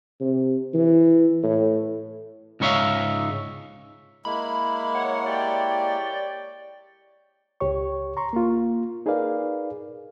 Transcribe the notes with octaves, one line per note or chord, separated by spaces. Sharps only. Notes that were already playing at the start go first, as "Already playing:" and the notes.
C3
E3
A2
C#2 G#2 D#4 C#5 E5 F5
G#3 A#3 E4 B5
C#5 F#5
G4 C#5 D5 G5
C#2 G4 C#5 C#6
A#5 C6 C#6
A#3 F4
D#4 G#4 A#4 B4 D5 F5